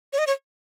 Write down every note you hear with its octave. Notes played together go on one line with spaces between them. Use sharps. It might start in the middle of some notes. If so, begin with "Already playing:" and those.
C#5
D#5
C#5